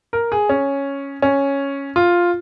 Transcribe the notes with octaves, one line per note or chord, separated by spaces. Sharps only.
A#4
G#4
C#4
C#4
F4